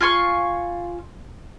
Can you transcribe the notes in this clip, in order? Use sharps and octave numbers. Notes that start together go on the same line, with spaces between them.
F4 G#5 C6 C#6